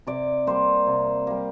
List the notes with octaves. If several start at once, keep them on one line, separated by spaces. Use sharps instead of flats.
C3 D5
G3 A#3 C5
C3
G3 A#3